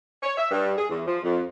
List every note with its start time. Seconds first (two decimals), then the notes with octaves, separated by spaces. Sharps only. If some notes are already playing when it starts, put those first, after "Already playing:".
0.23 C#5
0.37 E5
0.51 G2
0.77 G#4
0.89 E2
1.07 F3
1.23 F2